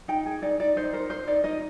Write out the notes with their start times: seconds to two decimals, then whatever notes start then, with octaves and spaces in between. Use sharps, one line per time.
0.08 D#4 G5
0.26 G#4
0.42 D#4 D5
0.60 D#4 D5
0.76 D#4 C5
0.93 A#4 C5
1.10 D#4 C5
1.27 D#4 D5
1.44 D#4 D#5